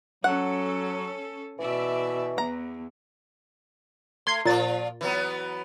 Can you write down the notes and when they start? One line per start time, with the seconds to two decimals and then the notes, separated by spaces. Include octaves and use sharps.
0.24 F#3 C#4 A4 F#5
1.59 B2 E3 D5 E5
2.38 E2 A#5
4.27 A3 C6 G#6 C7
4.46 A#2 F3 F4 D5 A6
5.01 E3 F#3 B3